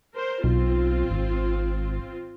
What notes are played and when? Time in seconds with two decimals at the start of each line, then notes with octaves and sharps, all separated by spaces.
0.13 A#4 C5
0.44 B1 C4 F4
1.11 G#1